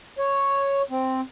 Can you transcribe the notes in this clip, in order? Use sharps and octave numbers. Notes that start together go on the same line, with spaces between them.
C#5
C4